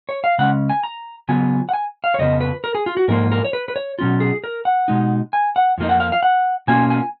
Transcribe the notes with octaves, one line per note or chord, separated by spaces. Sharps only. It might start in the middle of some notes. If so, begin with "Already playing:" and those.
C#5
F5
C#3 G#3 C#4 F#5
G#5
A#5
C#3 F#3 B3 F4 G#5
F#5
G#5
F5
C#5
F2 C#3 F3 B3 D#5
B4
A#4
G#4
F4
F#4
G#2 F3 A#3 F4 A#4
A#4
C#5
B4
B4
C#5
B2 F#3 C#4 F4
G#4
A#4
F#5
B2 G#3 D#4
G#5
F#5
F2 F3 A#3 D#4
F#5
F5
F5
F#5
B2 A#3 C#4 F4 G#5
G#5